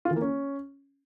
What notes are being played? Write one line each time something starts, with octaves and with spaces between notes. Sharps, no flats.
F4
E3
A#3
C#4